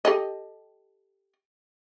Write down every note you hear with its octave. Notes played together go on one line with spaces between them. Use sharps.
G4 A4 D#5